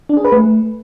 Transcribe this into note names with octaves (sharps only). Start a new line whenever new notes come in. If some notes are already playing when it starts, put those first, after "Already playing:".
D4
G#4
B4
A3